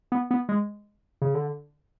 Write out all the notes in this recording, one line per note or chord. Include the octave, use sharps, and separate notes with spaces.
B3
B3
G#3
C#3
D3